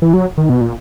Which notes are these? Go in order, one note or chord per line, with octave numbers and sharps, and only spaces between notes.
E3
F#3
D#3
B2
A#2